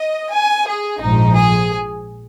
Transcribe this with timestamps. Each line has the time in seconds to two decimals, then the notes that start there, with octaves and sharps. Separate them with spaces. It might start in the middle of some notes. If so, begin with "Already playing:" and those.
Already playing: D#5
0.31 G#5
0.66 G#4
1.01 A#1 G#2 F3 D#4
1.37 G#4